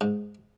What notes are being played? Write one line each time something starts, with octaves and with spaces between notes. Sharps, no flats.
G#2